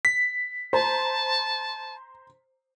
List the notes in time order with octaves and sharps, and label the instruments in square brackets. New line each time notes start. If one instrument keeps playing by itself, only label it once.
[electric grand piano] B6
[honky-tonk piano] C5 A#5 [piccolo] A5